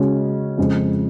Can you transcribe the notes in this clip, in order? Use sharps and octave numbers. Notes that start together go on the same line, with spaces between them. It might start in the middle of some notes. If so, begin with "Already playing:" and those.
Already playing: C#3 G#3 C#4 F#4
F2 C#3 G#3